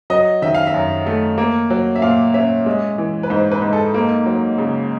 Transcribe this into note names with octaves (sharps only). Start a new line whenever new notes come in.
F#3 D#5
D#3 E5
F5
E5
F#2
A3
A#3
F#3
E5
A#2 F5
C#4 E5
G#3
E3
B4
G#2 C5
B4
G#2
A4
A#3
F#3
C#3